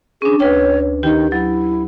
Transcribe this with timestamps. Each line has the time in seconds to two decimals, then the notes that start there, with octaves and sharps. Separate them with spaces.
0.22 C#4 D4 G#4
0.40 D2 B4 C#5 G5
1.03 D#3 G4 G5
1.32 F#3 E4